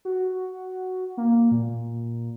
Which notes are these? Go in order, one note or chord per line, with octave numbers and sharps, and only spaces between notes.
F#4
A#3
A#2